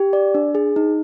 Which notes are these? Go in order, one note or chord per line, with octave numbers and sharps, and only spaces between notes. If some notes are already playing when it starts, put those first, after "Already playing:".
Already playing: G4
D5
D4
G#4
D#4